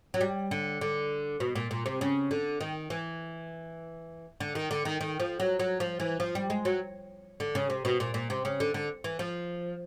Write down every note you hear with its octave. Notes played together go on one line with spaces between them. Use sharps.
F#3
G3
D3
D3
B2
A#2
A#2
C3
C#3
D3
D#3
E3
D3
D#3
D3
D#3
D#3
F3
F#3
F#3
F3
E3
F3
G3
G#3
F#3
D3
C#3
C3
B2
A#2
A#2
C3
C#3
D3
D3
E3
F3